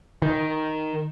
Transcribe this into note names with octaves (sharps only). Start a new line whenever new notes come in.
D#3